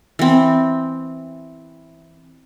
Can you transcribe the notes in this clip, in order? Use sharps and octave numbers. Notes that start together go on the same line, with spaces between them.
E3 C4